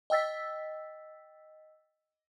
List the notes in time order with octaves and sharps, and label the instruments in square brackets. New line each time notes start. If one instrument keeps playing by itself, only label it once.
[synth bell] D#5 G5 E6 A6 B6